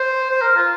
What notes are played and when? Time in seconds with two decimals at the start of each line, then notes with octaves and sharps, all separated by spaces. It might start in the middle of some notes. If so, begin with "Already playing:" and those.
Already playing: C5
0.31 C5
0.42 A#4
0.56 F4